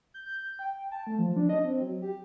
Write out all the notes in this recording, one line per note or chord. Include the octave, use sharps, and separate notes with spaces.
G6
G5
A5
A3
F3
D4
D#5
C4
F#3
G4